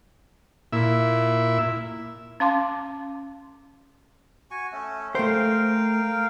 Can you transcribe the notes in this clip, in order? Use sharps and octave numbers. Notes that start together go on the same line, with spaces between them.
A#2 E4 E5
C#4 F5 A5 C6 D6
F#4 G#5 C#6
A3 C#4
A3 A#4 C5 F5 G5